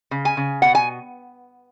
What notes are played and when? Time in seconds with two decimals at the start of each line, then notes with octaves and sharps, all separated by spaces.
0.11 C#3
0.25 G#5
0.37 C#3
0.62 B2 F#5
0.75 G#5